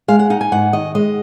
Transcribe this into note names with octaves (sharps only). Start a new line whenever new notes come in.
G#3 F5
F#5
D#4 F#5
G#5
G#2 F#5
D#3 D#5
G#3 D#5